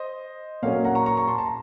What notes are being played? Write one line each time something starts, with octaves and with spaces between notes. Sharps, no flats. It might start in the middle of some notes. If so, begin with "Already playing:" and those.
Already playing: C5 D#5
A#2 F#3 A#3 C#4 C#5 F5
F#5 A#5
A#5 C#6
A#5 C#6
A#5 C#6
A5 C6
A5
A#5